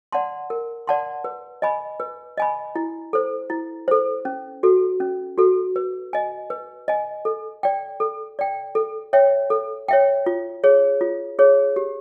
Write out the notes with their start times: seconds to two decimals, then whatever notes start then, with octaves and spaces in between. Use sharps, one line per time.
0.12 D5 F#5 A5 C6
0.50 A#4
0.87 D5 F#5 A5 C6
1.24 B4
1.62 D#5 G#5 B5
2.00 B4
2.38 D#5 G#5 B5
2.76 E4
3.13 A4 C5
3.50 E4
3.88 A4 C5
4.25 C#4
4.63 F#4 A4
5.00 C#4
5.38 F#4 A4
5.76 B4
6.13 D#5 G#5
6.50 B4
6.88 D#5 G#5
7.25 A4
7.63 D5 G5
8.00 A4
8.39 D5 G5
8.75 A4
9.13 C#5 E5 G5
9.50 A4
9.88 C#5 E5 G5
10.26 F4
10.64 G#4 C#5
11.01 F4
11.39 G#4 C#5
11.76 G4